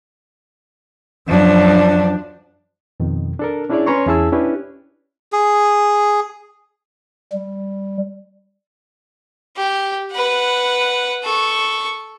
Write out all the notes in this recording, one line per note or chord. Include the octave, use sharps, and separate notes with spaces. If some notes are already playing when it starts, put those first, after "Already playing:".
F#2 F3 D4
F2 B2 D#3
D4 A4 A#4
C#4 D4 E4 G#4 C#5 D5
C#4 B4 C#5 A#5 C6 C#6
E2 C#4 E4 G#4 A5 E6
C#4 D4 E4 G4 B4
G#4
G3
G4
B4 F#5
A4 C#6